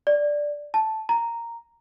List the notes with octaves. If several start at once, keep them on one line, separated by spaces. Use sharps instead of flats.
D5
A5
A#5